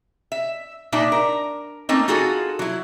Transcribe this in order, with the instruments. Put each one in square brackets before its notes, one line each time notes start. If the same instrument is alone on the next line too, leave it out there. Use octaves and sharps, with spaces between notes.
[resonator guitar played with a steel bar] E5
A#2 D4 D#4 E5
A#4
A3 A#3 C4 C#4 D#4
D#4 F4 F#4 G#4 A4
F#3 E4